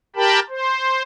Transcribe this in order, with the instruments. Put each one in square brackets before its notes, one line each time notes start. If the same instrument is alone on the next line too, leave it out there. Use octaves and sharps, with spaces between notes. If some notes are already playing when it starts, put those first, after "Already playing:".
[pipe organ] G4 A#4 G5 A5 B5
C5